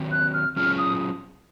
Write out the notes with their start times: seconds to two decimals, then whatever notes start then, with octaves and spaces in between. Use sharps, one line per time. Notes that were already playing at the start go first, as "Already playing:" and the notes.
Already playing: D#3 F#3 C4
0.12 F#6
0.34 F6
0.56 F#3 C#4 F4 G#4 C#5 F6
0.78 D#6